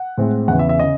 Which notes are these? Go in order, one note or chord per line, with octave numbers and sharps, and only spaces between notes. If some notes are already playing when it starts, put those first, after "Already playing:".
Already playing: F#5
A2 G#3 C4
E2 C#3 E3 F#5
E5
E5
C#3 D#5